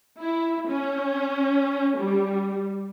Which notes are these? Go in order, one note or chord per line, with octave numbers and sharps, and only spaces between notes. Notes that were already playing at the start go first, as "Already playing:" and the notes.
E4
C#4
G3